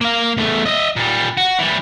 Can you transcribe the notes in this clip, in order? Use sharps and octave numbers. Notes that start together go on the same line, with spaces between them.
A#3 F5
E2 A3
D#5 E5
A#2 G3
F#4
E3 G3